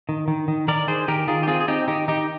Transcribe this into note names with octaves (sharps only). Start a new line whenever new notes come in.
D#3
D#3
D#3
D#3 A#4 D5
D#3 G#4 C5
D#3 G4 A#4
D#3 F4 G#4
G4
C4 F4 G#4
G#4
C4 D#4 G4
D#3 D#4 G4
D#3 D#4 G4